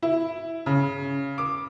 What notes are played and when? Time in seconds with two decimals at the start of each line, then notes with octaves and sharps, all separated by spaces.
0.03 E4
0.66 C#3
1.38 D6